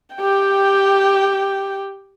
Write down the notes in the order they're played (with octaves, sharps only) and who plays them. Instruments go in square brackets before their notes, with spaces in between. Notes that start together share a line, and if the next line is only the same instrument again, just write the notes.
[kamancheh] G4 G5